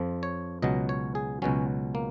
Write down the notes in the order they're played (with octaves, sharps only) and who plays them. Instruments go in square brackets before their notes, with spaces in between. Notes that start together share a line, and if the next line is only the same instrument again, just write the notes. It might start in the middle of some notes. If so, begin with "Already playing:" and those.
Already playing: [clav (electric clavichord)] F2 F3
C#5
C#2 B2 F#3 D#5
C#5
G#4
C#2 B2 F#3 C#4
A#3